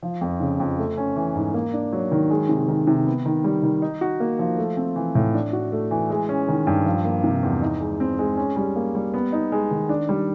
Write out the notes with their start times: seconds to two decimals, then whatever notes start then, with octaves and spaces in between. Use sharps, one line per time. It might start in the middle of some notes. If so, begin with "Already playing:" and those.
0.03 F3
0.21 F2
0.40 C#3
0.60 F2
0.78 A3
0.98 C#4
1.16 E3
1.36 G#2
1.54 A#3
1.73 D4
1.93 F#3
2.11 D#3
2.30 G#3
2.49 C3
2.68 D#3
2.87 C3
3.06 B3
3.26 D#3
3.44 G3
3.63 D#3
3.82 D#4
4.01 F#4
4.20 A#3
4.39 F3
4.58 A3
4.77 C4
4.96 E3
5.15 A2
5.34 D4
5.53 F#4
5.72 A3
5.91 E3
6.10 G#3
6.29 C#4
6.48 D#3
6.67 G2
6.86 F3
7.05 A#3
7.24 C3
7.43 E2
7.62 D#4
7.81 G#3
8.00 C4
8.19 G#3
8.37 C#4
8.56 G3
8.76 A#3
8.95 G3
9.14 B3
9.32 D#4
9.52 G#3
9.71 D#3
9.89 D4
10.09 G3